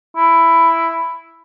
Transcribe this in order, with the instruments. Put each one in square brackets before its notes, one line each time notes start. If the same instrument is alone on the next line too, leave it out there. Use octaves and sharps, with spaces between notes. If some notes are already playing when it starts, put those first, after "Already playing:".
[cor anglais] E4